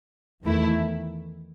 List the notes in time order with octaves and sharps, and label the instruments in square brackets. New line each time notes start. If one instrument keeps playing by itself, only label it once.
[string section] E2 D#3 A3 E4